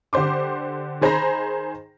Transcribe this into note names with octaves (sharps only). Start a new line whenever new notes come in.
D3 G4 C5 C6 D6
D#3 G#4 C5 A#5 B5 A#6